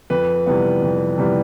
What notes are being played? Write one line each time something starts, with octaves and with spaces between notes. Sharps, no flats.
F2 B4
C3 E3 G3 B3
F2
C3 E3 G3 B3